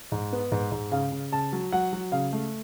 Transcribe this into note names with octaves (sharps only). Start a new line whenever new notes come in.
G#2
B3
G#2
G#2
C#3 F5
C#3
C#3 A5
F#3
F#3 F#5
F#3
C#3 F5
A3